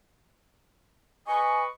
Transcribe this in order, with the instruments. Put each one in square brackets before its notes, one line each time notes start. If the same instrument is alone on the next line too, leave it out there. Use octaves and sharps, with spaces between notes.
[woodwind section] B4 D#5 C#6 [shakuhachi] G#5